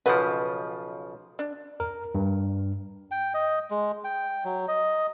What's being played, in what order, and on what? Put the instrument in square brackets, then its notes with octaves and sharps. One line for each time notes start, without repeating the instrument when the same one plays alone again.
[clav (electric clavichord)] B1 C#3 F3 [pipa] B4 F#5
[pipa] D4
[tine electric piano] A#4
G2
[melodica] G5
D#5
G#3
G5
F#3
D#5